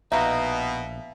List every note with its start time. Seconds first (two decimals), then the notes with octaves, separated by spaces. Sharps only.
0.12 A#1 B2 D#4 E5 F5